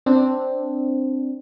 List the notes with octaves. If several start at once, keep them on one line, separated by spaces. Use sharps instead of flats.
C4 D4